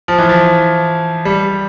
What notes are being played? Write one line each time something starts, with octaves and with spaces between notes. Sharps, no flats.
F3
E3
F3
G3